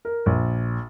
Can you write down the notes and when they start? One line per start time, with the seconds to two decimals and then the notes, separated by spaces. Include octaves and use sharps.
0.05 A#4
0.26 A#1